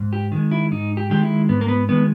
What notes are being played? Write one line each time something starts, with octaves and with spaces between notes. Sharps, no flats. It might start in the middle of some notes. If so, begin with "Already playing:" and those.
Already playing: G#2
G4
D#3 G#3
E4
G#2 D#4
G4
D#3 G#3 G4
E4
G#2 B3
A#3
B3
D#3 G#3 B3